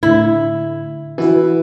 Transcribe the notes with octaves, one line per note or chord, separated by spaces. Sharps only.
A2 D3 E4
E3 E4 F#4 B4